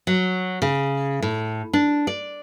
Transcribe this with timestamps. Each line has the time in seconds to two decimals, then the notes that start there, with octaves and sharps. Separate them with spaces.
0.07 F#3
0.62 C#3
1.22 A2
1.73 D4
2.07 D5